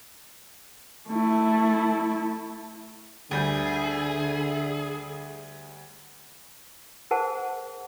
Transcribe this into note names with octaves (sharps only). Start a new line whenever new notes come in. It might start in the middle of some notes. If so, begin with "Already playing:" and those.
A3 E4
D2 D3 G3 G#4 E5 G6
G#4 A#4 C5 F#5 A5